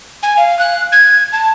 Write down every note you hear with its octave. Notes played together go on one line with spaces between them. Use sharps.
G#5
F5
F#6
G#6
A5